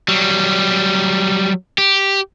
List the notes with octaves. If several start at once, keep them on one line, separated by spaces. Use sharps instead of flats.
F#3 G3
G4